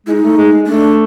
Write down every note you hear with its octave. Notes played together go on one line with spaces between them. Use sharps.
G#3 D#4 E4
A3
G#3
G#3
A3 D4